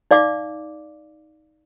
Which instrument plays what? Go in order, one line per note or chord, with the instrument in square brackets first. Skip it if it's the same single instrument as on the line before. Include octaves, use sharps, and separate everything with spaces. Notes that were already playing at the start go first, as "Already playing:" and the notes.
[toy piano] D#4 D5 F5 D6